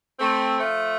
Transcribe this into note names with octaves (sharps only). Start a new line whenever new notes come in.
A3 C4
F3 A3